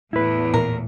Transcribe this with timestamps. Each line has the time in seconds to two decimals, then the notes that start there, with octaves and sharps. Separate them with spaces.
0.13 E2 A2 E4 B4
0.54 A#2 E3 A#4